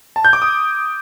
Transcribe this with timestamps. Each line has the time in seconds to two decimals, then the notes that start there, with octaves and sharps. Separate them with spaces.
0.16 A5
0.25 G6
0.33 D6
0.42 D#6